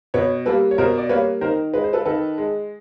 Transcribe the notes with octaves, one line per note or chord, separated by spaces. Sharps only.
B2 B4 C#5
G3 A#3 A4 B4
C#5
B2 A#4 C5
D5
G3 A#3 B4 C#5
D#3 A#4 C5
G#3 B4
C5
A4 B4
D#3 A4 B4
G#3